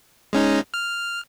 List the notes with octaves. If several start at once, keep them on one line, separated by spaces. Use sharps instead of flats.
G#3 C#4 D#4
F6